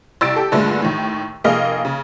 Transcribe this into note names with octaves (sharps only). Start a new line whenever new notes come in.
C2 E6 A6 D7
G4 A4
G2 A#2 D3 G#3 A3
D#2 A2
F1 A#3 G#4 D#5 F6
C#3